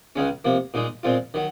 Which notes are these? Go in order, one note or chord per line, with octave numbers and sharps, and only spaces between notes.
C#2 C#3 G#3 C#4
C3 F3 A#3
A#2 G#3 D#4
A#2 G#3 C4 F4
D#3 F#3